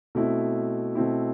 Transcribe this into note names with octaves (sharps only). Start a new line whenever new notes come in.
B2 A3 C4 E4
B2 A3 C4 E4